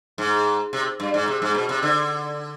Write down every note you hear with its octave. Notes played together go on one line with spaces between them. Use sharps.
G#2
C3
G2
G#2
C3
G#2
B2
C3
D3